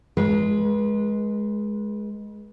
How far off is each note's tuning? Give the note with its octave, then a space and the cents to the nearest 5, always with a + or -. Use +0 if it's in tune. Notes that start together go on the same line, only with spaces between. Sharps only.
G#3 +10 B4 -35